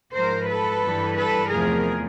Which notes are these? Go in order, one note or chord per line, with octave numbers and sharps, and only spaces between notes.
G#2 F3 G#3 A#4 C5
A4 B4
G2 E3 G3
A4 B4
E2 C3 F3 A3 G#4 A#4